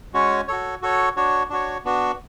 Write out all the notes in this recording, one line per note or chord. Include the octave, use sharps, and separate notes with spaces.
G#3 C#4 F#4 C#5
F#4 A4 C#5
F#4 A4 C#5
D4 F#4 C#5
D4 F#4 C#5
B3 D4 F#4